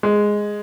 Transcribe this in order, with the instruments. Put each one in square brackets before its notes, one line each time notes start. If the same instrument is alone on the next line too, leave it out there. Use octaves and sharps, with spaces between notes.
[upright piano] G#3